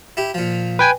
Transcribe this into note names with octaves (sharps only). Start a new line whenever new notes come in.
E4 G4
A#2 F3
B4 G5 G#5